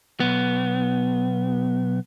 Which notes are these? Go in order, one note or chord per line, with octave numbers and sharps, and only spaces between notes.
B1 B3